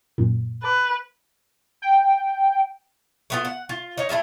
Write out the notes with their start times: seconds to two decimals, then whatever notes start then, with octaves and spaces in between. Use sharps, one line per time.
0.18 F#2 A#2
0.63 B4 A5 D6
1.82 G5
3.30 A3 B3 F4
3.45 F#5
3.69 F4
3.98 D#4 C#5
4.09 A3 E4 F4 E5